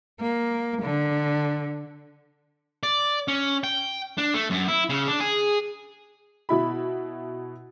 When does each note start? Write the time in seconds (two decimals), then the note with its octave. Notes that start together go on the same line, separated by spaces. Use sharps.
0.21 A#3
0.84 D3
2.83 D5
3.28 C#4
3.64 G5
4.18 D4
4.34 A3
4.50 F#2
4.68 E4
4.89 C#3
5.08 D4
5.20 G#4
6.49 B2 E4 B5